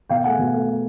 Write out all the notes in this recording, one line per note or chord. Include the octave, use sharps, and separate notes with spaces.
B2 F5 G5
A3 F#5 G#5
B2
A3